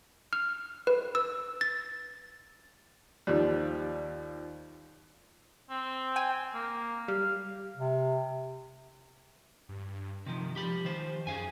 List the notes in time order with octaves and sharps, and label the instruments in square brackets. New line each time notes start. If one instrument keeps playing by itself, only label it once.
[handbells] F6
B4
E6
A6
[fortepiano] D#2 F3 G3
[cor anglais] C4
[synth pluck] G5 G#5
[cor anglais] A#3
[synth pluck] G3 [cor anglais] F5
[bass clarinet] C3
[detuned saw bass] G2
[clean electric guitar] C3 F3 [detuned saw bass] D#3
[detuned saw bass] F3 [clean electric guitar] G4 B5
[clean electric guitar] D#3 C5
[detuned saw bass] F#2 [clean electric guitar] G#4 F5 G#5